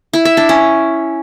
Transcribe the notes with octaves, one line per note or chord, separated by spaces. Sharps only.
E4
E5
D4
C#4